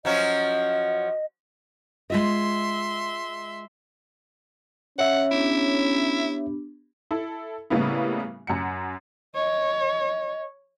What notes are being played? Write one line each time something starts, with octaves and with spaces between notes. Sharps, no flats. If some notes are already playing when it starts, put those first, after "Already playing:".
F3 F#3 C#4 D#5
G#3 F4 D#5 E5 C6
C#4 C#5 E5 F#5
B3 D4 E4 G4
E4 A4
A2 C#3 G3 A#3 B3 E4
F#2 F#5 C#7
C#5 D#5